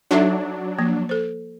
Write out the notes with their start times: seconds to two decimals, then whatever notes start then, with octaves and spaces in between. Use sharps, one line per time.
0.11 F#3 D4 D#4 A4 E5
0.79 F3 A#3
1.09 A4 C5